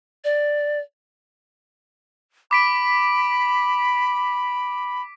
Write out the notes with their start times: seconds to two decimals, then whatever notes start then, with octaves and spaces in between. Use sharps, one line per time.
0.24 D5
2.51 B5 D6 B6 D7